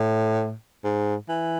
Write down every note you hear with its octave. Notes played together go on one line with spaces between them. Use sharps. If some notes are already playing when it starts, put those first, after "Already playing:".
Already playing: A2
G#2
E3